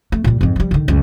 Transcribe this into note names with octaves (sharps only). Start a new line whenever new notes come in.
A3
A#2 G3
F2 G#2
F3 G3
D3 D#3
C#2 F#2